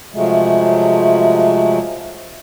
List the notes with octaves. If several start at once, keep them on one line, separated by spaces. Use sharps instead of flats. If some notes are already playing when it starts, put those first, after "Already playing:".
C3 F3 F#3 G#3 A3